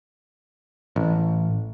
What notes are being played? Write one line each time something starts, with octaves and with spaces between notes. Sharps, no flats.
A1